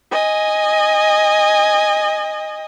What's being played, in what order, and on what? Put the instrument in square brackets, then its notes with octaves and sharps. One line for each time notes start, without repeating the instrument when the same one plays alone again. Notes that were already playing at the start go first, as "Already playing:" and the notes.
[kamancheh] D#5 G#5